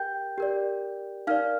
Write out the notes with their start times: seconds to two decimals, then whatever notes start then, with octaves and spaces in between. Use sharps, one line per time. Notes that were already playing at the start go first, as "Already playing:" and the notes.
Already playing: G4 A#4 G5 G6
0.38 G4 A#4 D5
1.27 D#4 A#4 D5 F5 F6